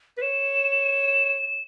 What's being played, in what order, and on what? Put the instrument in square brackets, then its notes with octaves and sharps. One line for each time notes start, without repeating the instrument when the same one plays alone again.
[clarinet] B4
[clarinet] C#5 [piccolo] E7